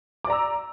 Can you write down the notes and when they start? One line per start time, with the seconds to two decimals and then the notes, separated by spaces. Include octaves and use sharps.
0.25 D6
0.27 D5
0.30 A#5
0.32 E6